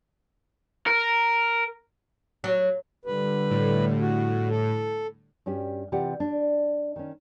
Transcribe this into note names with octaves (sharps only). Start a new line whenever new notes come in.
A#4
F#3
D3 G3 B4
A2
F#4
A4
G2 C#4 F#4 G4
C3 E3 F4 G4 D5 F#5
D4
D#3 C#4